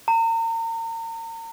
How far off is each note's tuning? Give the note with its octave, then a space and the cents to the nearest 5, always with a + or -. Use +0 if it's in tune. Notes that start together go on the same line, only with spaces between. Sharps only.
A#5 -40